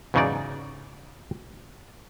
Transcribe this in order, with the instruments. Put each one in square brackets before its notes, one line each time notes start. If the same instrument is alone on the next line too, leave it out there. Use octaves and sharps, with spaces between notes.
[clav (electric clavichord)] E2 G#2 C#3 F#3 D#4 D5